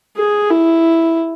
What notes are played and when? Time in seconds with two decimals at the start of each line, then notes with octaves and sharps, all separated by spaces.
0.17 G#4
0.50 E4